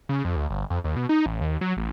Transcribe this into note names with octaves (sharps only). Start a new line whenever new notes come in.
C#3
F2
D2
G1
F2
D#2
B2
D#4
A1
D#2
F#3
A1